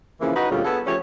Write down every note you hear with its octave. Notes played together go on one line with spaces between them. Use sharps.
C#3 E3 F3 A#3 E4
D#4 F#4 B4 D#5
D2 A#2 C#3 G3 F4
B3 G#4 A4
F3 A3 C#4 G4 C#5